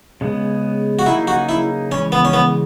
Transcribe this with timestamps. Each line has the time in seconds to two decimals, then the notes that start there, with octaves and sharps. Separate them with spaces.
0.21 C#3 G#3 B3
0.99 F#4
1.06 C#3 F#3 A#3 D#4 E4 G#4
1.28 F#4
1.49 E4
1.91 C#3 E3 G#3 C#4
2.12 B3
2.25 C#4
2.33 B3